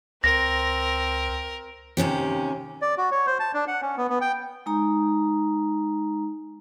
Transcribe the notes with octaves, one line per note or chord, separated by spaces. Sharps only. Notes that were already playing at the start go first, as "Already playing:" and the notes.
C#2 C4 A#4 A#6
D#2 C3 C#4 G4
D5
F#4
C#5
C5
A5
D4
F#5
C#4
B3
B3
G5
G#3 D#4 A#5